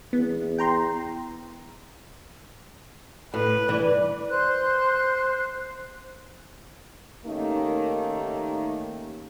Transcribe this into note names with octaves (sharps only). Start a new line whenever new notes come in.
E2 B3
G5 A#5 C6
A2 B4
G2 E3 D5 B5
C5 C6 F#6
D#3 A3 A#3 C#4 D#4 G4